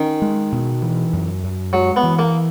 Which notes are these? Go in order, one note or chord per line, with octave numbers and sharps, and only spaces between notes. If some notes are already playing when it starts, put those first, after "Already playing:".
Already playing: D#3 C#4
G#3
B2
E3
F#2
F#2
F#3 G#3
B3
E3
A#3